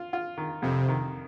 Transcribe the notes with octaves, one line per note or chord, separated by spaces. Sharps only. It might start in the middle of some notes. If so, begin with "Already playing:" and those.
Already playing: F4
F4
D#3
F2 C3
D#3